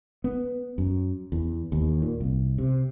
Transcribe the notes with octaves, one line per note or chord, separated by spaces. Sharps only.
B3
F#2
E2
D#2
A#2
C2
C3